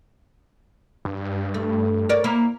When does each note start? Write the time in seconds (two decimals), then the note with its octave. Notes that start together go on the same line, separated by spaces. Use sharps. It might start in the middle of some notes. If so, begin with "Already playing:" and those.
1.05 G2
1.54 A3
2.09 A#4 C#5 D5
2.24 A#3 E4